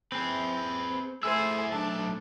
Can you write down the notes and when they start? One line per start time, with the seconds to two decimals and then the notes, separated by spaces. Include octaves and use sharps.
0.12 C4 G#4 B4
1.23 A3 E4 G#4 C5 G#5 E6
1.72 B1 A3 D4 A5